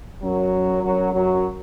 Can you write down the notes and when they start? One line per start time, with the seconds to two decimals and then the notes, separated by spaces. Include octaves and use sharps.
0.23 F#2 F#3
0.83 F#2 F#3
1.13 F#2 F#3